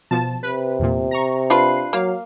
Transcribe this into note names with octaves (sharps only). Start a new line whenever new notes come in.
B2 F3 A5
C3 B4
E2 A#2
A#5 C#6
D4 F4 B4 C7
F#3 A#3 F5